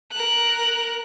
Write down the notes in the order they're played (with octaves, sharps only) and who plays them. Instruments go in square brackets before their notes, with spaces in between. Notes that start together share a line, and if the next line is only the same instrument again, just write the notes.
[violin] A#4 F#6